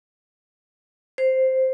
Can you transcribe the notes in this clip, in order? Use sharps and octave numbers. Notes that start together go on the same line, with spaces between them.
C5